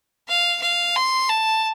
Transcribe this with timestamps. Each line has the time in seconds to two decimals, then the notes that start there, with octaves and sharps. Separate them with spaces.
0.28 F5
0.62 F5
0.96 C6
1.29 A5